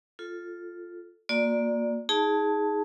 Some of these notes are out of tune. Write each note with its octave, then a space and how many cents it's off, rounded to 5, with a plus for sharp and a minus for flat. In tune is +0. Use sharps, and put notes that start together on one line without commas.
F4 +0 A4 +0
A#3 +0 F#4 -45 D5 +0
D#4 +30 G#4 +0 A5 +0